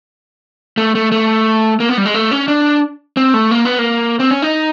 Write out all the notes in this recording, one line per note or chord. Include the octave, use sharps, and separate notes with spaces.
A3
A3
A3
A#3
B3
G3
G#3
A3
C#4
D4
C4
A3
A#3
B3
A#3
C4
C#4
D#4